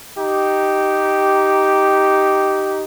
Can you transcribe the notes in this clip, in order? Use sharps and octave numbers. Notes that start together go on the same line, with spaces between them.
D#4 G4